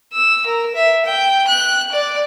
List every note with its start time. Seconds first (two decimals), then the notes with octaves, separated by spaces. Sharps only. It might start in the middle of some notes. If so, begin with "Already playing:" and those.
0.13 E6
0.46 A#4
0.75 E5
1.06 G5
1.48 F#6
1.92 D5